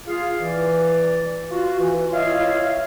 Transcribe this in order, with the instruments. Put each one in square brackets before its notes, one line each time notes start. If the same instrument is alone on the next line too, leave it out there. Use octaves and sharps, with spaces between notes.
[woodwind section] F4 G#4 F5
E3 D5
F4 F#4
E3
E4 F4 C#5 D#5 F5